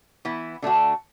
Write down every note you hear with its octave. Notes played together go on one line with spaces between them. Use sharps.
E3 B3 E4
D3 A3 D4 F#4